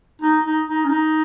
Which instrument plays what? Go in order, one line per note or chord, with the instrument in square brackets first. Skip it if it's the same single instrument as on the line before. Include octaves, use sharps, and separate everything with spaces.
[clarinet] D#4
D#4
D#4
C#4
D#4